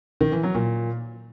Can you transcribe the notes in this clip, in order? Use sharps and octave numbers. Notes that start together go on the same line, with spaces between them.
D#3
E3
F#3
A#2